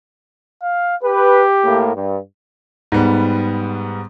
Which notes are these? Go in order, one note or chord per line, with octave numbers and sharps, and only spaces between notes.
F5
G4 B4
A2 A#3
G2
G#2 G3 B3